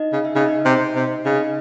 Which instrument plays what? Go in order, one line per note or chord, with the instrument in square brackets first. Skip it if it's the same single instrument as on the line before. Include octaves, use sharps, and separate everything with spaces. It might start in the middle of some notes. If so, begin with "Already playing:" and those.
Already playing: [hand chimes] D#4 D#5
[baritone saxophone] C#3
[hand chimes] E5
[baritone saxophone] C#3 [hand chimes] D#4 D#5
[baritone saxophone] C3
C3
[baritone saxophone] C#3 [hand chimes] D#4 D#5